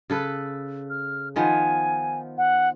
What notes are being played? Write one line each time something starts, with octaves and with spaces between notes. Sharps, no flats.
C#3 A4 B4
F6
D#3 F3 B3 G#5
F#5